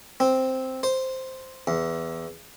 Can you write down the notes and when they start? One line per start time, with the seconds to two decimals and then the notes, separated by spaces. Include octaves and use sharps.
0.20 C4
0.83 C5
1.67 E2